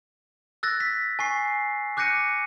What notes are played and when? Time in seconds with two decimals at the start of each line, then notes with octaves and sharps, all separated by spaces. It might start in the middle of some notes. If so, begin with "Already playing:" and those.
0.63 E6 F#6 A6 A#6
0.80 B6
1.19 G#5 C#6 C7
1.97 D6 F#6 G6 A#6 C#7 D#7